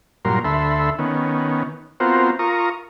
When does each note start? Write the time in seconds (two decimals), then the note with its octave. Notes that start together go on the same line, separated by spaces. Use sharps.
0.25 G2 A#2 F#3 A#4 C6
0.45 D2 A4 E5 B5 C6
0.99 D#3 B3 C#4
2.00 B3 C4 F4 F#4 A#4 C5
2.39 F4 A#4 A#5 C#6 D#6